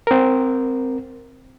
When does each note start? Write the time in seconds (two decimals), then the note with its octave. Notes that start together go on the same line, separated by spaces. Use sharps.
0.07 C4 A#4